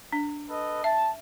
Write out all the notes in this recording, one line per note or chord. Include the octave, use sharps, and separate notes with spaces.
D4
A4 B4 D#5
E5 A5